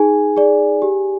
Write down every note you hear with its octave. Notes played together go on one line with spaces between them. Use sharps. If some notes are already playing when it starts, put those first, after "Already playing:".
Already playing: D#4 G#4 G#5
G#4 D5
G4